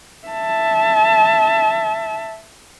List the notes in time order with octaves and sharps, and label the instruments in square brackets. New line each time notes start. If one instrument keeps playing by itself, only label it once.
[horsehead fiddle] E5 A5